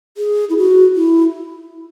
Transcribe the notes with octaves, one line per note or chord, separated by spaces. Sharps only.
G#4
E4
F#4
E4